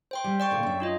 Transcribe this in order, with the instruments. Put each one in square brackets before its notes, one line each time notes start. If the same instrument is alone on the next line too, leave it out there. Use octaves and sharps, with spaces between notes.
[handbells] C5 G5 C6
[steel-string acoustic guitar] G3
[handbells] D5 G5 C#6
[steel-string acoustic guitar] A#2 D3 D4
F#2 E5
[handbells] D4 F4 D#5